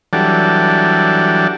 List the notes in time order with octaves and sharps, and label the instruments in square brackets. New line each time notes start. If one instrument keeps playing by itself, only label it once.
[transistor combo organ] E3 F#3 G3 D4 A4